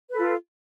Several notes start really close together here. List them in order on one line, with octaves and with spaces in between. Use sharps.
B4 A4 F4